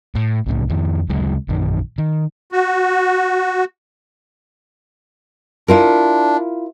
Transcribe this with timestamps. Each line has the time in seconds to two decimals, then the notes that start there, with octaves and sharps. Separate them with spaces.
0.15 A2
0.46 C2 A2 C#3
0.69 F2 D#3
1.09 D2 C#3 F#3 G#3
1.49 A#1 F#2 D#3
1.98 D#3
2.52 F#4
5.68 D4 E4 F4 A#4